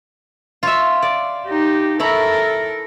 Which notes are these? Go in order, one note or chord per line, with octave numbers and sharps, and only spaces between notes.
F4 C#5 E5
D5
D#4 G4
E4 A4 A#4 C#5 B5